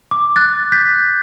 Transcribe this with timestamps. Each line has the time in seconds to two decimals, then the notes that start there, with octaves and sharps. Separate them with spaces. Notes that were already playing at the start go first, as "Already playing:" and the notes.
0.11 D6
0.36 F#6 A6
0.72 G6 B6